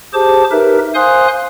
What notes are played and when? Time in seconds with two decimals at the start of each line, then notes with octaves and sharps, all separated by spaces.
0.14 G4 G#4 C5 A5 D6
0.51 D#4 G4 A#4 B4 E5
0.95 C5 F5 G#5 C6 D#6 F#6